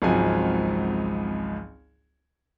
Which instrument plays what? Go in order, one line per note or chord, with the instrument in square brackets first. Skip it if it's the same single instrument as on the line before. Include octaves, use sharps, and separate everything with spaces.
[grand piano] G#1 C#2 F3 F#3 C4 G#5